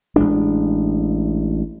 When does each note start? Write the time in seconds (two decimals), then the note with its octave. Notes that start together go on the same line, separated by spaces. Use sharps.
0.16 A1 G#3 D4